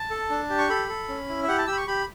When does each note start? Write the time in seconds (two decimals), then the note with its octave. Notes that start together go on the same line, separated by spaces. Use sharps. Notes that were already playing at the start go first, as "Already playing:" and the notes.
Already playing: A5
0.10 A4
0.30 D4
0.50 G4
0.58 C#6
0.70 A4 B5
0.88 A4
1.08 C#4
1.29 E4
1.43 E5
1.48 G4 F#5
1.58 A5
1.67 G4 E6
1.72 B5
1.77 C#6
1.87 G4 B5